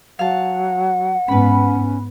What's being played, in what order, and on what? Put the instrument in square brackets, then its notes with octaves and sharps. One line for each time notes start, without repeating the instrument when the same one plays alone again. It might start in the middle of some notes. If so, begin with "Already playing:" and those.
[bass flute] F#3 [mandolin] F5 A5 [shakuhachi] F#5
[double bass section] G#2 B3 [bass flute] C#4 [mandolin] B4 B5